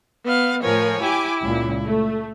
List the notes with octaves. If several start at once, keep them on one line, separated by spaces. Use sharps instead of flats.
B3 F5
A2 F3 A#4 C#5 G#5
E4 G4 G#5 D6
C#2 A#2
A3